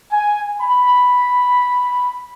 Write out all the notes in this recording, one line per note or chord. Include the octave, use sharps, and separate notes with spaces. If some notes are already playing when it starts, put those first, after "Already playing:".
G#5
B5